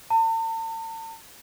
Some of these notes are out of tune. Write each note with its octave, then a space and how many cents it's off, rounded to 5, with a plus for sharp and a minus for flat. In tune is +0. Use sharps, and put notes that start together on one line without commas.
A5 +45